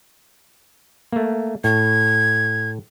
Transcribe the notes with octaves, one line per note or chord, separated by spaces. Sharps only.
A3 A#3
A2 G#6